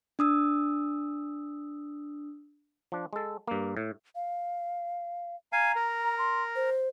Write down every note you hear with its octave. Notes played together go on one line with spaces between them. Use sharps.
D4 D#6 E6
F3 D4
G#3 A4
G2 A#3
A2
F5
F5 G#5 A#5
A#4
C6
C5